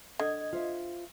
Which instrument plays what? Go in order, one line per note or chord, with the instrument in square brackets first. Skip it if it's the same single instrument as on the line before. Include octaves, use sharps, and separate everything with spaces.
[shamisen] D3 [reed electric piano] D#5 G#6
[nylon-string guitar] F4 C5 E5